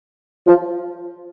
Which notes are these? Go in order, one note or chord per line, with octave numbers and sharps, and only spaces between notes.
F3